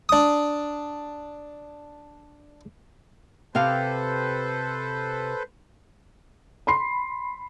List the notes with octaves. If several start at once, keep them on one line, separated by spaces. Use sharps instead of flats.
D4 D#6
C3 G4 A4 B4 C5 F5
B5 C6 C7